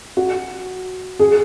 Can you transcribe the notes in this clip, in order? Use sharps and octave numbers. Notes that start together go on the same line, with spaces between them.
F#4
G#4